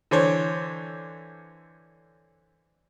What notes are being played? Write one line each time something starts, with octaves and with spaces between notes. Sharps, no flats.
D3 E3 C5 C#5